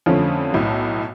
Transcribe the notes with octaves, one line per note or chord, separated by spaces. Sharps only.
F2 D3 F3 A3 C#4
B1 A2 F#3